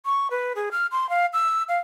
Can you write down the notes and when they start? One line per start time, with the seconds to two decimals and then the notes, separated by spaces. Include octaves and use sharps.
0.06 C#6
0.31 B4
0.56 G#4
0.72 F6
0.92 C6
1.10 F5
1.33 E6
1.69 F5